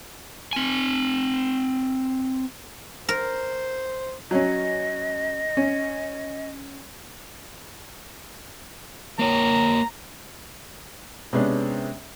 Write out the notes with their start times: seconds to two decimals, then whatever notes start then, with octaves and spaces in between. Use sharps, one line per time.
0.53 C4 G#5
3.09 A#4 C5
4.31 F#3 C#4 D#5
5.57 C#4
9.19 A#3 C#5 A#5
11.33 C3 G#3 B3 C#4 D4